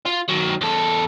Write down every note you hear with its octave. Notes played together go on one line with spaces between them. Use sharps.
F4
D#3 F#3
E2 A4